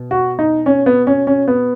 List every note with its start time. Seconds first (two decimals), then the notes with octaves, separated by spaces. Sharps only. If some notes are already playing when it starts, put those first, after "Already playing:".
Already playing: B2
0.11 F#4
0.39 D#4
0.66 C#4
0.86 B3
1.07 C#4
1.27 C#4
1.48 B3